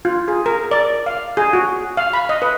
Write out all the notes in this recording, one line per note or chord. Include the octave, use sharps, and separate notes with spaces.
F4
G#4
A#4
D5
F5
G#4
F#4
F5
B5
D#5
B4